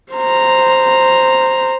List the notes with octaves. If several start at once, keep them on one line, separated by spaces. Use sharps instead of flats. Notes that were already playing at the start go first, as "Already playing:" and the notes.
C5 A#5